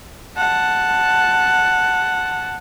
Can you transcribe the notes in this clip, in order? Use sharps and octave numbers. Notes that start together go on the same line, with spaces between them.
F#5 A5